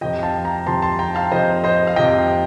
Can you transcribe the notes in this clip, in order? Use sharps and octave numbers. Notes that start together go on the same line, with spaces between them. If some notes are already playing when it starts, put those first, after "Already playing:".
F2 C3 F3 D#5 G5
F5 A5
G5 A#5
F2 C3 F3 A5 C6
A5 C6
G5 A#5
F5 A5
F2 C3 F3 C5 D#5
C5 D#5
F5
F2 C3 F3 D#5 G5